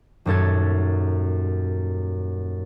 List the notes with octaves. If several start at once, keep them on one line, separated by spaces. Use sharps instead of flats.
D#1 F#2 A4 G#6